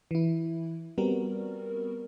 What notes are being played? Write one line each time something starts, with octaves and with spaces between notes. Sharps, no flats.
E3 E4
G3 B3 C4 F#4 A#4